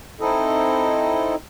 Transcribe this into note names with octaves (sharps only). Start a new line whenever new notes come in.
C4 D#4 E4 A4 D#5